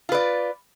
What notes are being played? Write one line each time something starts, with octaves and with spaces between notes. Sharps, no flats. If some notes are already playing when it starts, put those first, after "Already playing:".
F4 B4 D5